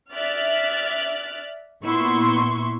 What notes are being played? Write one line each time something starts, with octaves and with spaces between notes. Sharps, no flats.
D5 E5 F6 F#6 A6
A#2 B3 E4 C6 C#6